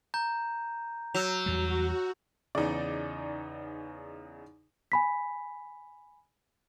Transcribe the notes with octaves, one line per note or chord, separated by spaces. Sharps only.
A#5 G6
F#3 E6 G6 F7
E2 G3 F#4
E2 C#3 D#4 D5
G#5 B5 B6